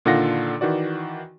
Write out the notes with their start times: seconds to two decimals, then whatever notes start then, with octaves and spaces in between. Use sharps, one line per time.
0.05 A#2 D3 D#3 F4 F#5 A#6
0.61 D#3 E3 F#4 D5